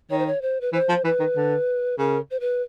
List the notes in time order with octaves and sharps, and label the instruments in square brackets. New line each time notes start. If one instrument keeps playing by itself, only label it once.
[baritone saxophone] D#3 [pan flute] C#5
[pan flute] C5
C#5
C5
B4
[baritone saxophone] E3 [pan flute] C5
[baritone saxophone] F3
[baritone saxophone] E3 [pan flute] B4
[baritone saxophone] D#3
D3
[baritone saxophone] C#3 [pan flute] A#4
[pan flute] C5
B4